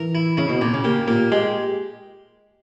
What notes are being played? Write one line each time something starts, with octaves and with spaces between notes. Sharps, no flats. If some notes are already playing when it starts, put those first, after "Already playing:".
Already playing: E3 A#4
E4
C#3 E4
B2
A#2 D#3
C#3
A#3 G4
A#2 A#3
G#3 G4